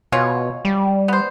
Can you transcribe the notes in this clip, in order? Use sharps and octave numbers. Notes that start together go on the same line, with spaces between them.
B2 G#3 F4 C#5
G3
B3 C5